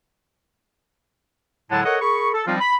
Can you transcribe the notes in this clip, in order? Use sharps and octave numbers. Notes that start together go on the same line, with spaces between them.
A2 D3 F#3 G#3 F#5 A5
A4 A#4 C#5 D#5 F#5
G#4 A#4 B5 C#6
A4
F3 G3 C4 D4 D#4 F4
B5